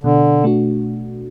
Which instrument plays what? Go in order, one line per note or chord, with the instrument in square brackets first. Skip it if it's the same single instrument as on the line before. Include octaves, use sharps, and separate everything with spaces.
[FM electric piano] B2 [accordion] D3
[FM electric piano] A3 D4 F#4